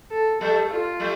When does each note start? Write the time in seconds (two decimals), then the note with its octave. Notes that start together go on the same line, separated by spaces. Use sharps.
0.11 A4
0.41 G3 A3 A4
0.70 F4
1.00 G3 A3